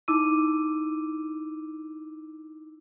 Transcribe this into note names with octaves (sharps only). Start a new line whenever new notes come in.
D#4 E4 D6 E6 D#7